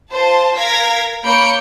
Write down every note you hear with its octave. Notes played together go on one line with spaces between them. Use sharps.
F4 C5 A5
A#4 F5 G#6 A#6 B6
A#3 C#5 B5 G6 C#7 D7